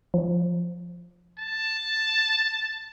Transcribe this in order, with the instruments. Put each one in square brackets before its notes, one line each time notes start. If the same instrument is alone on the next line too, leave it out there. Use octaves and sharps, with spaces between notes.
[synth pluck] F3
[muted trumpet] A5